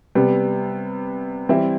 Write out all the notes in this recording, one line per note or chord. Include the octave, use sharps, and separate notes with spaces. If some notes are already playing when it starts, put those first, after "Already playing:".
C3 G3 B3
E3 G3 C4 E4